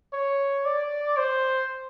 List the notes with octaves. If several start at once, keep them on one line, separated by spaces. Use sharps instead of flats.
C#5
D5
C5